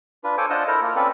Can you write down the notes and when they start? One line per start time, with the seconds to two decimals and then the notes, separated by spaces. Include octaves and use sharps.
0.24 D4 F4 B4
0.38 A4 C5 C#5 G#5 D6
0.50 D4 F4 C5 D#5 F#5 A5
0.68 E4 A4 A#4 C5 A#5
0.82 A#3 F4
0.96 C4 C#4 A4 B4 D5